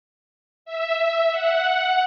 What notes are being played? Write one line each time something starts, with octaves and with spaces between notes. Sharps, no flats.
E5
F#5